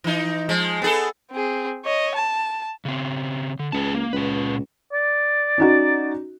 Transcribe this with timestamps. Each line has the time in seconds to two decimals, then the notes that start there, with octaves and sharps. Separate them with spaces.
0.04 E3 D#4
0.49 F3 G#3
0.82 B3 G#4 A4
1.32 C4 G#4
1.85 C#5 D#5
2.15 A5
2.85 C#3 C4
3.59 D3
3.72 C#2 G#4 B4 A5
3.94 A#3
4.13 C#2 A#2 B4
4.93 D5
5.58 C#4 D#4 F#4